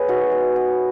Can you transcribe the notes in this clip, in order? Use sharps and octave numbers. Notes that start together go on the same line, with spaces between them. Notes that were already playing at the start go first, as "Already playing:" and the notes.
Already playing: B3 G#4 B4 C#5
D#4 F#4
G#3
B3